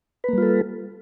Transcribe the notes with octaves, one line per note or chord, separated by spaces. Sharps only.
G3 A#3 F4 A4 B4